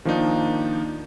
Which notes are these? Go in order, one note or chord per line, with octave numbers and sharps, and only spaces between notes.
D#3 F3 A#3 D4 D#4